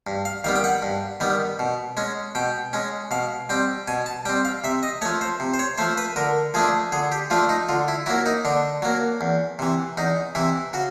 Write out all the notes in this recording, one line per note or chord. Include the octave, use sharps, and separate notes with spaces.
G2
F5
D#3 G3 B3 F5
G5
F#5
G2
D#3 G3 B3
B2
G#3 C#4
B2 G5
G#3 C#4
B2 F5
G3 C4 G5
B2 G#5
A5
G3 C4 G5
F5
C3 E5
D#5
F3 A3 C#5
C5
C3
C5
C#5
F3 A3 C5
B4
D3 A#4
F3 A3 D4 G#4
D3 G#4
G4
F3 A3 D4 F4
D#4
D3 F4
E4
F#3 A#3 E4
D#4
D3 D4
F#3 A#3
E2
C3 E3
E2 D#4
C3 E3 E4
C#3 F#4